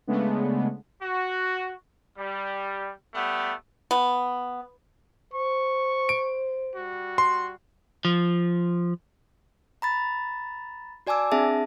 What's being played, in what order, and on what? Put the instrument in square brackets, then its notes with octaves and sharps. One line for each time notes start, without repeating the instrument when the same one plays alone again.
[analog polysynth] C#3 G#3 A3 B3 D4
[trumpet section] F#4
G3
G3 A3 B3
[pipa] B3
[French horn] C5 [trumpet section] C#6
[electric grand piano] D7
[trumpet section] G3 F#4
[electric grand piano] C6
[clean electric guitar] F3
[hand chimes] A#5 B5 A6
F#4 D5 G#5 A5 D6 E6
C4 D4 G#4 E5 A5